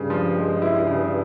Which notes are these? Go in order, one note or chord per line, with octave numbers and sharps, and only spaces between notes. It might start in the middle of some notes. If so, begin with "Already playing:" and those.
Already playing: G2 C#3
F3
G#3
E4
C#3